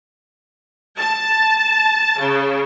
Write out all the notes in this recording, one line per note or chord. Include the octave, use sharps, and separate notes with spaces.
A5
C#3